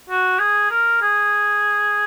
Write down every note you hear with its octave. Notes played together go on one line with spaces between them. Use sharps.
F#4
G#4
A#4
G#4